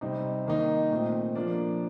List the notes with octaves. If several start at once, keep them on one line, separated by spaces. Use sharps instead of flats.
C3 G3 C4 D#4
D#3 A#3 D#4
A#2 A3 C4
F3 A#3 D4